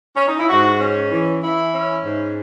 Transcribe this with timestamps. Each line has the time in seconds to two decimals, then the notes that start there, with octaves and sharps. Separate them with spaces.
0.17 C#4
0.28 D#4
0.38 E4
0.49 G#2 F#4
0.80 C#4
1.11 E3
1.43 E3 E4
1.74 C#4
2.05 G#2